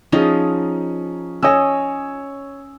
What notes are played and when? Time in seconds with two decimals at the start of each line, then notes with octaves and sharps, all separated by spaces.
0.12 F3 C#4 D#4 G#4
1.43 C#4 C#5 D#5 D#6 E6